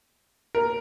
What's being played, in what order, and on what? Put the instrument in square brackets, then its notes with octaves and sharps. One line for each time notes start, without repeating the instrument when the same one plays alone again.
[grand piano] A#4